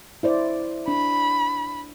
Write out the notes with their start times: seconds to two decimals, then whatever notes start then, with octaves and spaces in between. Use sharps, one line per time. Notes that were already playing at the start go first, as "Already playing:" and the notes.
0.23 E4 C5 D5
0.88 D4 B5